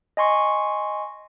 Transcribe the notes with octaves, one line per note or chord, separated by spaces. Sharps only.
D#5 G#5 C6 C#6